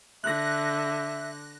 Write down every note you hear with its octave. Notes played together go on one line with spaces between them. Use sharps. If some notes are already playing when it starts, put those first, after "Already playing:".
D3 E5 F#6 A#6